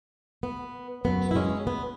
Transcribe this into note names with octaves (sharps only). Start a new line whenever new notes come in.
B3
F#2 F#3 B3
E4
G#3 C#4
B3